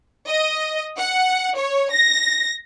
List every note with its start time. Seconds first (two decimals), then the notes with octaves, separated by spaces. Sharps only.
0.27 D#5
0.97 F#5
1.56 C#5
1.90 A#6